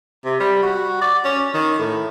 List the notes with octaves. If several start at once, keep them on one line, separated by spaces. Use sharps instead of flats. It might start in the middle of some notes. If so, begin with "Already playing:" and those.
C3
G3
F#4
D5
C#4
D#3
A2